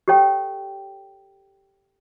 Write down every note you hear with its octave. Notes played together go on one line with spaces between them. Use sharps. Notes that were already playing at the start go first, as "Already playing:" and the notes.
G4 A4 C#5 G5